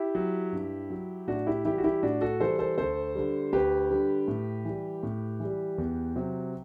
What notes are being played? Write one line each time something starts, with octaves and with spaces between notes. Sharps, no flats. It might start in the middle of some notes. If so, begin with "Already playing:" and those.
Already playing: E4 G4
F#3
G2
F#3
A2 D4 F#4
E4 G4
E3 G3 E4 G4
F#4
E4 G4
A2 D4 F#4
F#4 A4
E3 G3 A4 C5
A4 C5
D2 A4 C5
D3 G3
D2 G4 B4
D3 G3
A2
E3 G3
A2
E3 G3
E2
C3 F#3